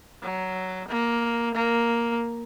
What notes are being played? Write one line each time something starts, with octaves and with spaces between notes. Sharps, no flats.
F#3
A#3
A#3